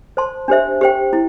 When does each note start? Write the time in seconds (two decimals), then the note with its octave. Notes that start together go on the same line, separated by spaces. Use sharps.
0.17 C5 A5 C6
0.48 D4 G4 C5 E5
0.81 G4 C5 G5
1.13 E4